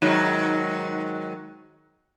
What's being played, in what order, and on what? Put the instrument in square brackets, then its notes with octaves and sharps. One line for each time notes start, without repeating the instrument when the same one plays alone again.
[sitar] G#2 D#3 F#3